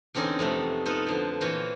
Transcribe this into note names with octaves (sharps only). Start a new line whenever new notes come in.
E2 D3 C4 C#4 D#4 C6
F2 C3 A3 B3
B3 D#4 F4 A4 B4 C5
D3 F3 C5
A#2 E3 F4 F#4 C5 C#5